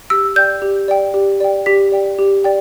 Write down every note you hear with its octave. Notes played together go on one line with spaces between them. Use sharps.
G4 E6
D5 G5 G6
G4
D5 G5
G4
D5 G5
G4 B6
D5 G5
G4
D5 G5